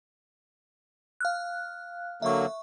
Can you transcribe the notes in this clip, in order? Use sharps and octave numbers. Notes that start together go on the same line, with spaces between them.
F5 F6 F#6
D3 F#3 A#3 E5 C#6